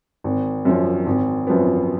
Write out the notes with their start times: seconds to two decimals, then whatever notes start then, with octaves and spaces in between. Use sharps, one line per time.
0.24 G#1
0.65 F#2 F3
1.06 G#1
1.47 F#2 F3 B3